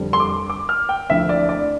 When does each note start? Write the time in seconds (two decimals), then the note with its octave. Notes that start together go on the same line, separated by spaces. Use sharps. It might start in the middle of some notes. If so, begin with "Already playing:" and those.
Already playing: F2 D3 G3 D4
0.13 C6
0.20 D6
0.50 D6
0.69 F6
0.89 G5
1.09 D2 D3 F3 C4 E4 E5
1.29 D5
1.49 D5